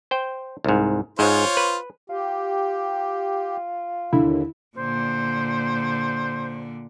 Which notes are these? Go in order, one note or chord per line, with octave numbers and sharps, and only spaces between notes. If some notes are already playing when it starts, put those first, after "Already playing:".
C5 G5
C2 G#2
G#2 G#3 F4 C5 C#5
B4
F4 G4
D#2 D3 E4
A#2 D3 C5